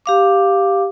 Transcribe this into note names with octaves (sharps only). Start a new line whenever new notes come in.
G4 F5 D6